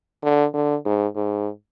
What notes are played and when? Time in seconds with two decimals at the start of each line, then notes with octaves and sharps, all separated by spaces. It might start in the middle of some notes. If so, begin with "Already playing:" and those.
0.23 D3
0.53 D3
0.85 G#2
1.15 G#2